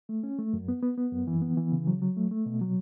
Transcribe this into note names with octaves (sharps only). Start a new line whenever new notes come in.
A3
C#4
A3
F#2
B3
B3
B3
F#2
E3
B3
E3
C#3
F#3
F#3
A3
A3
B2
F#3